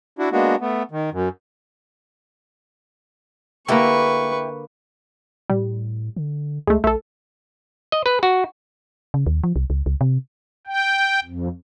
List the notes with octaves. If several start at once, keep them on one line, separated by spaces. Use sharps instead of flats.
D4 E4 F#4
G#3 A#3 B3 D4 F#4
A3 B3
D#3
F#2
D3 A#3 E4 G4 A4 B4 C#6
A2 G3
D3
C#2 G#3 A3
A#1 A3 A4
D#5
B4
F#4
C#3
D#2
F3
C2
C#2
C#2
C3
G5
F2